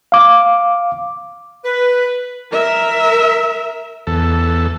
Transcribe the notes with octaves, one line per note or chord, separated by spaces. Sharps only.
F5 D6
B4
A#4 E5
E2 A4